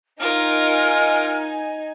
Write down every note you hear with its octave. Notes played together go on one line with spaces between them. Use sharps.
D#4 F4 A#4 G#5 F6